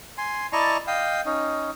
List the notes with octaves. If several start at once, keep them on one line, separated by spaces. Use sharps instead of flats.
G#5 C6
E4 D5 D#5 A5 A#5 C#6
D#5 F5 G5
C#4 D#4